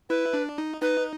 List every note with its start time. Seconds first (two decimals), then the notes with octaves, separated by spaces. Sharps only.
0.09 E4 B4
0.33 D4
0.58 D#4
0.81 D#4 B4